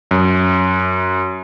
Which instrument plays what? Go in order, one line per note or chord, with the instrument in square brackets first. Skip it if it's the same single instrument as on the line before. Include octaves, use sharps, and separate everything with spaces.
[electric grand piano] F#2